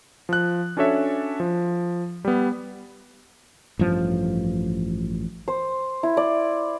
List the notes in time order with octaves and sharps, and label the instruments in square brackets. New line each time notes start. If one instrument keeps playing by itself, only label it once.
[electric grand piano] F3 F#6
C#4 D4 F#4 A4 C#5 E5
F3
G3 B3
[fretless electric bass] A1 G2 F3
[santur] C5
E4
D5